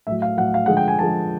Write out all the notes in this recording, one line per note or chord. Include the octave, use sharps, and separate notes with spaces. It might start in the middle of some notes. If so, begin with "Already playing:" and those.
A2 F#3 E5
F5
A2 F#3 F#5
F5
D3 F3 G#3 F#5
G5
G#5
D3 F3 G#3 A5